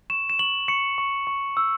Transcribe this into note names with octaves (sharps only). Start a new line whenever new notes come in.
C#6 E7
E7
C#6 F#7
C#6 C#7
C#6
C#6
E6